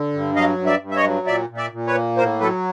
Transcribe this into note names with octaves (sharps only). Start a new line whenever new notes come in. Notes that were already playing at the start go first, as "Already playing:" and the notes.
Already playing: D3
G2
F#3 D#5 F5
G2
D5 E5
G2
E5
C#5 D#5
F#3
A#2 D5 E5
A#2
D5 E5
A#2
B4 C#5
A#3
A2 A#4 C5
F#3 A4 B4